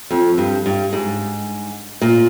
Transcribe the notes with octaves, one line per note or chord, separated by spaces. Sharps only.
F2
G2
G2
G#2
A#2